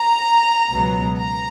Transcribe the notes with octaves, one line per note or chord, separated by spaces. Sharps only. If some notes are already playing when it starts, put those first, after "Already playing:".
Already playing: A#5
C#2 B2 F#3 B3
A#5